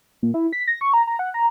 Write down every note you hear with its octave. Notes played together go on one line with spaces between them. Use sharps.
A#2
E4
B6
A#6
C#6
A#5
A#5
F#5
A#5